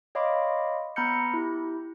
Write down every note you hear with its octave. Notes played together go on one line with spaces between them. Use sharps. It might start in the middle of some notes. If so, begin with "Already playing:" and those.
C#5 D#5 F5 B5 C6 D6
B3 A#5 B5 F6 G6 C#7
E4 G4